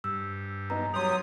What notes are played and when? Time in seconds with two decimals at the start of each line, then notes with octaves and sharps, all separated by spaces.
0.04 G2 E6
0.70 F#2 B3 D#4 A#5
0.94 F#3 G3 C6 D#6 F7